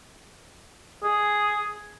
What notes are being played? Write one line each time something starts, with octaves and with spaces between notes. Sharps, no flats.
G#4